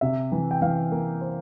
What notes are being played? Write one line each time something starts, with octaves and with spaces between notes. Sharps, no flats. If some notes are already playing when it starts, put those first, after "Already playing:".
C3 E5
E3
G5
E3 F5
A#3
C5